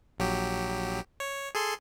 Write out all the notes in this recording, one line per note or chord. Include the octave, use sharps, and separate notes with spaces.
A#1 F#3 G4
C#5
G#4 A4 C6